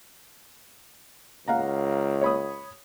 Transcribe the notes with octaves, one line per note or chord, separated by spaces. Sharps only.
C#2 F5 F#5 A#5
C#5 B5 D#6